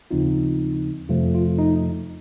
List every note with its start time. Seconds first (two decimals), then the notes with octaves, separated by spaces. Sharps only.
0.11 D#2 C#3 F3 C4 D#4 F4
1.09 F2 C3 F3 A3 F4
1.35 F4
1.58 D#4